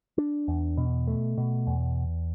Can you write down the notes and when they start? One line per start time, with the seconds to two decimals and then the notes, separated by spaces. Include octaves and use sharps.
0.18 D4
0.48 E2
0.77 B2
1.07 A3
1.37 B2
1.67 E2